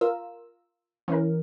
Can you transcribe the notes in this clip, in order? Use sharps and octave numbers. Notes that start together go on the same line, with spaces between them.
F4 A#4 E6
E3 C#4 A#4